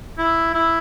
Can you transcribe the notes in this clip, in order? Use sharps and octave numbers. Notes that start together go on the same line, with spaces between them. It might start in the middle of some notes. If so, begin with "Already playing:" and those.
E4
E4